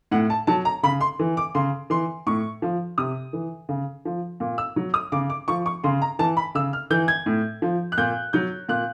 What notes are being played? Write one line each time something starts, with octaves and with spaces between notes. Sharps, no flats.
A2 F#5
A5
F#3 A5
A#5
C#3 B5
C6
E3
D6
C#3 C6
E3 C6
A2 C#6
F3
C3 D#6
E3
C#3
F3
A#2
E6
F#3
D#6
C#3 D6
D6
F3 C#6
C#6
C#3 C6
A#5
E3 A5
B5
C#3 E6
F6
E3 G6
G#6
A2
F3
F#6
A#2 G6
F#3 G6
A#2 F#6